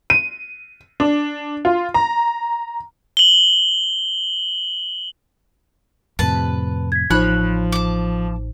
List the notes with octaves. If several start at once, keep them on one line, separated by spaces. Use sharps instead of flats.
D#7
D4
F4
A#5
F#7 G7
F2 A2 C3 B4 A5
G#6 B6
A1 F3 D#4 C5 C#5 B5 F#6
A5 D6